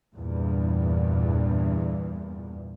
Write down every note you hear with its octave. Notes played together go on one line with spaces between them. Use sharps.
E2 G2 A#2